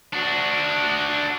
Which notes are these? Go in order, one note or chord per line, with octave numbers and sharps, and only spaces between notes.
D4 F#4